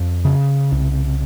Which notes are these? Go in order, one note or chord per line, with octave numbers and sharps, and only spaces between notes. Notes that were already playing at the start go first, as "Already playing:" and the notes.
Already playing: F2
C#3
C2